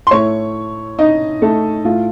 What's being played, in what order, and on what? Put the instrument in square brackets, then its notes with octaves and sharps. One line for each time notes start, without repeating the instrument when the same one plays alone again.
[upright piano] C6
A2 A3 C#5 C#6
D#4 D#5
A3 A4
A2 A3 F4